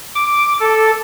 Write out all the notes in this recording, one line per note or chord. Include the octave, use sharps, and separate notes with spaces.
D6
A4